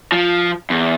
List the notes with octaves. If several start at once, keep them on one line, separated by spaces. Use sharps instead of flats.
F3
E2